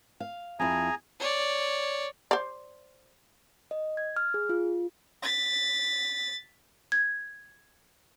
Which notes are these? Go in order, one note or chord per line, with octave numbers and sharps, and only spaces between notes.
F5
F2 E4 G#4 G#5 A#5
C#5 D5
C5 D5
D#5
G#6
F6
G#4
F4
A6 B6
G#6